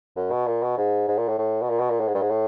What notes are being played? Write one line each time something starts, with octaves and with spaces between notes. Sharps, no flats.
F#2
B2
A#2
B2
G#2
G#2
A#2
A2
A2
B2
A#2
B2
A#2
A2
G#2
G2
G#2
A2